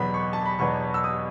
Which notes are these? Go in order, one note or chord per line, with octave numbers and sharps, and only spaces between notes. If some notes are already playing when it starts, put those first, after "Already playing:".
Already playing: E2 B2 F#3 B3 B5
C#6
A5
B5
E2 B2 F#3 B3 C#6
E6
D#6